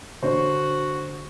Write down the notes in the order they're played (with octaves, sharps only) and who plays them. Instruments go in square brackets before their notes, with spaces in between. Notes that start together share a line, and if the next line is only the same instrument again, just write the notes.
[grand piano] D3 C5 C#5 [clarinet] F#4